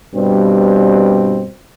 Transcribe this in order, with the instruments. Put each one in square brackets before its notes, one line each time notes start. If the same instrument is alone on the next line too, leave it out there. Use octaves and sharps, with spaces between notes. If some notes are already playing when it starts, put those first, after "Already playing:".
[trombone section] G2 B2 G3 C4